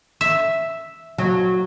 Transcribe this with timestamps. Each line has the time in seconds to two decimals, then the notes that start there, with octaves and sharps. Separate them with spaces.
0.21 E5
1.18 F#3